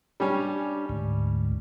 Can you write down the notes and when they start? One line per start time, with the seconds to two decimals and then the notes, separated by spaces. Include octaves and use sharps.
0.20 G3 C#4 D4
0.89 D2 G#2